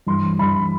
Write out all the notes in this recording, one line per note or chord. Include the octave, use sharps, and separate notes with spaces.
G2 E3 C6
G2 E3 B5